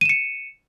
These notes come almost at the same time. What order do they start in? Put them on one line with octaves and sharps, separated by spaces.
D#7 E7 C#7